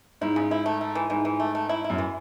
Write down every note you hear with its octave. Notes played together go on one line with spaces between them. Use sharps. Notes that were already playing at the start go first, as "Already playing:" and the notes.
G#2 E4
C#3
E4
A3
A3
E3
G#2 E3
E3
A3
A3
E4
E4
F#2
E3